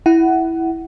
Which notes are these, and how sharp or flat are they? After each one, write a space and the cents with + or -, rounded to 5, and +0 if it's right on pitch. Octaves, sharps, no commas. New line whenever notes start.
E4 +0 F#5 +15